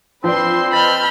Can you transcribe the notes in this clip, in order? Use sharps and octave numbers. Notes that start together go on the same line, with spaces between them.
F3 C4 D4 B4 C6
B4 D#5 A5 B5 F6 G6 A6